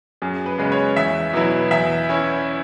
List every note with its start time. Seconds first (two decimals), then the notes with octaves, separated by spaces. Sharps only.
0.22 F#2 G#4
0.46 B4
0.58 C#3 G#3 B3
0.72 C#5
0.96 E2 E5
1.33 B2 F#3 B3 E4
1.71 E2 E5
2.09 E3 C#4 E4